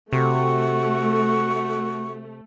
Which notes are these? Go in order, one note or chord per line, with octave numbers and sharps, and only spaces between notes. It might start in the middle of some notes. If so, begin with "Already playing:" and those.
C3 A3 F#4 C#6